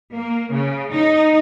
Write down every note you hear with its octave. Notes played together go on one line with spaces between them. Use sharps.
A#3
C#3
D#4